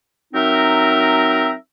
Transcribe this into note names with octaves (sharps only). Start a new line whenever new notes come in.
F#3 C4 D#4 A#4 E5